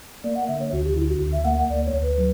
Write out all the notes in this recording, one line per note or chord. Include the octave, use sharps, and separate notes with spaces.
A#3 D5
F#5
D3 E5
C#5
D2 F#4
G4
D3 E4
F#4
D2
E5
A#3 F#5
F#5
D2 D5
C#5
D2
B4
F#3